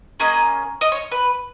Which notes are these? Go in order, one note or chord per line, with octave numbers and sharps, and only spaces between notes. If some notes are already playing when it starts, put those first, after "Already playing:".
A#3 C#4 G#4 D#5
D#5
C#5
B4